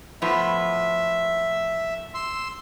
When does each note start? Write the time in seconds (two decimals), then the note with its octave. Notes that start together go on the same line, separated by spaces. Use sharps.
0.22 A2 F3 B3 E5
2.14 C6 E6